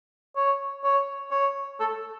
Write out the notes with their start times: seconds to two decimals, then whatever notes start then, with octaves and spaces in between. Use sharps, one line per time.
0.36 C#5
0.84 C#5
1.31 C#5
1.80 A4